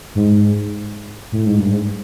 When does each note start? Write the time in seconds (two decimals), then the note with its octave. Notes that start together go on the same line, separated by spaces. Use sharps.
0.15 G#2
1.32 A2
1.46 G#2
1.58 G2
1.71 G#2